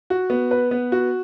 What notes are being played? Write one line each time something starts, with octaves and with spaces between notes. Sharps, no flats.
F#4
B3
B4
B3
F#4